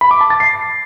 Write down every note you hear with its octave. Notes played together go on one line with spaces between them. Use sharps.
B5
D6
A5
A6
C7